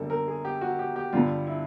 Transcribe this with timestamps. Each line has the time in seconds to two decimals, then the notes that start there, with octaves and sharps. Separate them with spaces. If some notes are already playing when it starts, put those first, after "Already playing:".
Already playing: F#2 D3 G3 A#3 A4
0.10 A#4
0.27 G#4
0.45 G4
0.61 F#4
0.79 G4
0.96 G4
1.13 G2 D3 G3 F4
1.47 E4